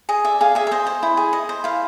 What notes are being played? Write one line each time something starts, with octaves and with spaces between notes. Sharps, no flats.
G#4 D#5
D5 E5
G#4 F5
G#4 E5
E5
C5 D#5
C5
E4
G#4
D#5
C5
E4 F5